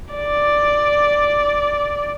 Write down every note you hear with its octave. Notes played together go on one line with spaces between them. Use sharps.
D5